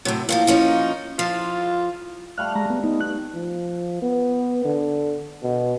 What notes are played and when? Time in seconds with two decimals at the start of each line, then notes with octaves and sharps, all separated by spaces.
0.05 A2 C3 F#3
0.29 A2 F3 A#3 F4
0.47 F3 C#4 D#4
1.19 F3 F4
2.37 G3 A3 F5 F6 F#6
2.55 G#3 A#5
2.70 B3
2.84 B3 D#4
3.01 F#6
3.34 F3
4.02 B3
4.65 D3
5.43 B2